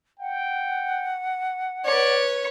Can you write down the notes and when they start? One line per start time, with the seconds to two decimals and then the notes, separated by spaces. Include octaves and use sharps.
0.20 F#5 G5
1.85 B4 C#5 D5